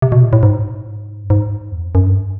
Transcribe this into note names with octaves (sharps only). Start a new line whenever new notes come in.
C3
B2
A#2
A2
G#2
G2
G#2
E2
F2
F#2
G2